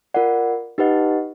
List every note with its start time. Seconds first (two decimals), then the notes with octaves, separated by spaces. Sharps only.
0.14 F4 A#4 D5 F#5
0.78 D#4 G4 B4 D#5 F#5